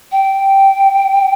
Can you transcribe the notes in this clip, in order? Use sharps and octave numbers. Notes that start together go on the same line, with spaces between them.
G5